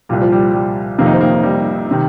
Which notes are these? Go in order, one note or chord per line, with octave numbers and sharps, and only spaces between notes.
C2 A#2 G3
F3
G3
G3
F1 F2 C3 D#3 A#3
D#4
C4
A#3
G3
C3 D#3